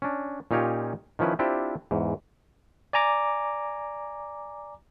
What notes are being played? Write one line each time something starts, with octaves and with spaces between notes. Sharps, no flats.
C#4 D4
A#2 C#4 D#4 F4 G4 C#5
D#3 F3 C#4 E4 B4
C4 D4 E4 F4 G4 C5
E2 G#2
D5 G#5 A#5 D6